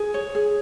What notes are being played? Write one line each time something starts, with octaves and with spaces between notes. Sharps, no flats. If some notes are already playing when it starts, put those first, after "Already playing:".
Already playing: G#4
C#5
G#4